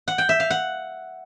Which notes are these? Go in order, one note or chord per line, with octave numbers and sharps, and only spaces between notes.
F#5
G5
E5
F5
F#5